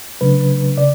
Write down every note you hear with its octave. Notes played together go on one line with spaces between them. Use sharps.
C#3 F#3 A3 D4 B4
C#3 D5